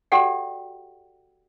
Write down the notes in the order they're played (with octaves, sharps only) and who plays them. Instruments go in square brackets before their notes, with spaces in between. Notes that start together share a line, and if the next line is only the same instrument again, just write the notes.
[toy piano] F#4 G4 A4 D5 F#5 G5